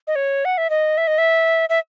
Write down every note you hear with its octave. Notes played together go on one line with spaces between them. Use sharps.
D#5
C#5
F#5
E5
D#5
E5
D#5
E5
E5